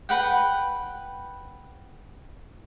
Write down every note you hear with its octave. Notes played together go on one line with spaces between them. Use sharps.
B4 F#5 G5